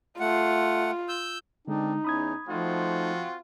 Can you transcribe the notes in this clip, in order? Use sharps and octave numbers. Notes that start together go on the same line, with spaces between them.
A3 F4 F#5
E6 G6
D3 G#3 C4 D4 D#4
E2 C#4 E4 B5 D#6 G#6
F3 A3 C4 D#4 F4 F#4